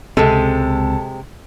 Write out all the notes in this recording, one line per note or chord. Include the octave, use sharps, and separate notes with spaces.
C#2 C3 G#3 C4 A4